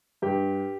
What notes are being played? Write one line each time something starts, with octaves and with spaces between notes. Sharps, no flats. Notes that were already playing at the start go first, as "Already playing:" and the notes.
G2 G4